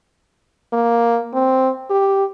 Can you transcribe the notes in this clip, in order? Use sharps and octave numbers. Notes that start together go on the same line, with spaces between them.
A#3
C4
G4